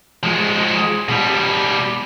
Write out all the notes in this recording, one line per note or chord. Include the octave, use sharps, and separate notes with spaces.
F3 G#3
B2 G3